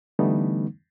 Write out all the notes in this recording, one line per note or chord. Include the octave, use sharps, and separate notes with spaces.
D3 E3 G3 A3 B3 D#4